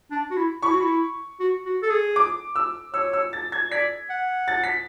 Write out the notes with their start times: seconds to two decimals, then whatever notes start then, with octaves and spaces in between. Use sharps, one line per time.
0.11 D4
0.31 F#4
0.37 E4
0.62 E4 C#6
0.71 F#4
0.81 E4
1.40 F#4
1.66 F#4
1.83 A4
1.91 G#4
2.16 D6
2.55 E6
2.93 C#5 E6
3.13 E6
3.33 A6
3.52 G#6
3.71 D5 B6
4.10 F#5
4.48 A6
4.64 B6